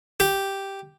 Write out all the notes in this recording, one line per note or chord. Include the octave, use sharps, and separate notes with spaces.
G4